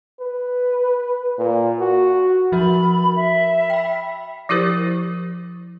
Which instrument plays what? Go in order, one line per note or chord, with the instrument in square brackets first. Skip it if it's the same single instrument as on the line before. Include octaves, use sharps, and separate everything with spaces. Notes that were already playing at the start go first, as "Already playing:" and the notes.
[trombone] B4
A#2
F#4
[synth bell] F3 F#4 A#4 [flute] B5
[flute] E5
[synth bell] G5 B5
[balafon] F3 E4 G4 A#4 C5